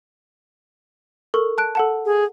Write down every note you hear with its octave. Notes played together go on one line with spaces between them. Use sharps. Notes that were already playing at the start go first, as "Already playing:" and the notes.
A4 A#4 C#6
A5 F#6 D7
A4 F#5 A5
G#4